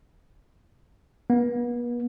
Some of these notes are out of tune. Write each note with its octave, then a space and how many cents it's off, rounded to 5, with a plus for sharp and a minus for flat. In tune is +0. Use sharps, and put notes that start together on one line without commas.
B3 -40